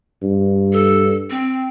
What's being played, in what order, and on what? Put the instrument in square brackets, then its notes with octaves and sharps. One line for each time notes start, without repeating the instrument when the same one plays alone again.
[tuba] G2
[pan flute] A4
C4